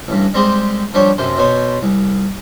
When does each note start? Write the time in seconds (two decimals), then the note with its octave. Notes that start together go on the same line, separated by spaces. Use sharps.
0.08 A1 G2
0.34 G3 G#3 C4 G4 G#4 C5
0.94 F3 G3 D4 G4 C#5
1.18 F#2 C3 A4 C5
1.38 B2 B3 C5 C#5
1.83 C2